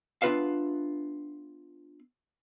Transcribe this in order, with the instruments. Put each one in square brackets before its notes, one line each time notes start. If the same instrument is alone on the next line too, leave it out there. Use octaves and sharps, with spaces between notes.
[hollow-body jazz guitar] B3 D4 F4 B4 E5 F5